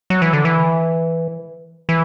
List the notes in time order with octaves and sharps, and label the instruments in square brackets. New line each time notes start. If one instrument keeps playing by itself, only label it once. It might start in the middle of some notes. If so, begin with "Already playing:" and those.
[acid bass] F#3
E3
D3
E3
E3